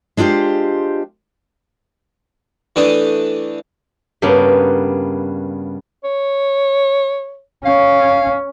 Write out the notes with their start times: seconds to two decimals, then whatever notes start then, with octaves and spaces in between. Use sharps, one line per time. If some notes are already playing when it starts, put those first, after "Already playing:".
0.17 G#3 D4 F4 G4 C5
2.76 E3 A3 D4 G4 A5 D#6
4.22 G2 C#3 A#3 B3
6.04 C#5
7.65 C#4 F5